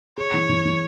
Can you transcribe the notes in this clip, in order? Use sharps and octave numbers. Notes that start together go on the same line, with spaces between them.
G#4 C#5
E3
E3
E3